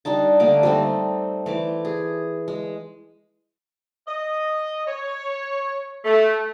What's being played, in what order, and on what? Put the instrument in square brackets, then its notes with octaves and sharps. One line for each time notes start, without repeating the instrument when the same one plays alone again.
[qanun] G3 D4 D#4 A5
D3 A3 A#3 D6
G3 A3 C4 D#4
E3 A3 D6
G#4
G#3
[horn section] D#5
C#5
A3